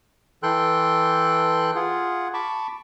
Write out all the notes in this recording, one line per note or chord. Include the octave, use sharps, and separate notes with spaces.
E3 A4 G5 C6 F#6
F4 G#4 F#5
A5 B5 C#6 D6